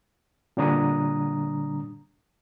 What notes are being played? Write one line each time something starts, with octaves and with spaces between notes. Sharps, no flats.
A#2 D3 G3 D4 A#5 D#6